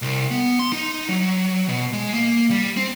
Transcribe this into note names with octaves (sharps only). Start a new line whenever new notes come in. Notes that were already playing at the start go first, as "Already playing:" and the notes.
C2
B3
C6
D#4
F#3
B2
G#3
A#3
G3
C4